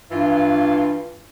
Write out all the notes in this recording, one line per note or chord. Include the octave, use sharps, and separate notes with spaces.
G2 E3 F4